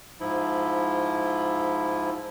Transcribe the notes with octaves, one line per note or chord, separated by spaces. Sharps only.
G#2 F3 E4